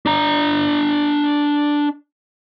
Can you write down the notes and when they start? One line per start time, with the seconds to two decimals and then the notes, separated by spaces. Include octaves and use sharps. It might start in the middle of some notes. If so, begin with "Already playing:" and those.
0.06 D4 A#5